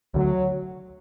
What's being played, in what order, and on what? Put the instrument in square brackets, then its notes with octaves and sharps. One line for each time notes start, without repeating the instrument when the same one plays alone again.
[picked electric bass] D2 D3 A3 [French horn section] F#3